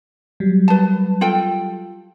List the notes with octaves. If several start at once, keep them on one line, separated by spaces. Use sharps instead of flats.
F#3 G3
B4 A5
F4 A4 G5